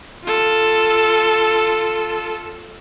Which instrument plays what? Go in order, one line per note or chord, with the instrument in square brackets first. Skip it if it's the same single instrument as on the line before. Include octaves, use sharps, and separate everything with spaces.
[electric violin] F4 A4